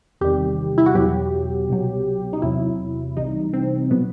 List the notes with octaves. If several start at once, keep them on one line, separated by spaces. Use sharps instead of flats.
E2 C3 D#3 G3 G4
E4
F#4
E2 B2 F#3 G4
C2 B2 F#3
D#4
E2 C3 F#3 E4
C2 C3 E3 G3 D#4
C4
B2 F#3 B3